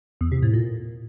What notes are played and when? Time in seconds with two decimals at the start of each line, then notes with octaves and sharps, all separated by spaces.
0.21 E2
0.32 C3
0.43 A2
0.53 A#2